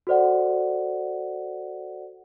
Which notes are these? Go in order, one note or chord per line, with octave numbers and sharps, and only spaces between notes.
F#4 A4 C5 D5 F#5